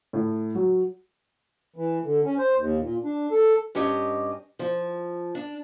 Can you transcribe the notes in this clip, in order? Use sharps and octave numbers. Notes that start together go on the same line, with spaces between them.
A2
F#3
E3
D3
C#4
C5
D#2
A#2
D4
A4
G2 C#4 G4 D#5
F3
D4